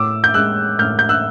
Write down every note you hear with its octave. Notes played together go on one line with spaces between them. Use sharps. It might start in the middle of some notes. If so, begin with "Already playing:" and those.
Already playing: A2 D6 E6
G6
G#3 E6 F#6
A2 F6 G6
G6
E6 F#6